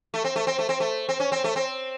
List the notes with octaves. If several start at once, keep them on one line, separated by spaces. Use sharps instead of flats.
A3
C4
A3
C4
A3
C4
A3
C4
C#4
C4
A3
C4